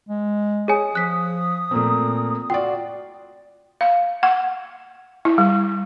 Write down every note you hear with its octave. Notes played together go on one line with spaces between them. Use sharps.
G#3
G#4 C#5 G#5 D#6
F3 F#6 B6
A#2 A3 A#3 C4
F4 F#4 D5 G5
F5
F#5
E4
G3